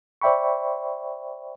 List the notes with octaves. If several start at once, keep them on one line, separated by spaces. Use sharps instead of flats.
C5 D5 E5 G5 B5 C#6